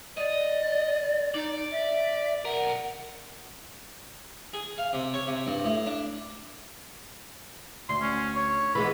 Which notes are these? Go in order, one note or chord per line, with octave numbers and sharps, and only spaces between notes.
D5 D#5
D#4 D5
E5
B1 A#4 F#5
G#4
F5
C3
C#5
C3
G2
A2
D4
D2 C6
C#4
C#5
E3 G#3 B3 B5